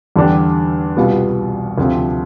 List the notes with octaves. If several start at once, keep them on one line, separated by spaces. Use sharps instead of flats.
E2 D3 G3 D4 G4
C2 B2 G3 B3 F4
D2 C3 F3 C4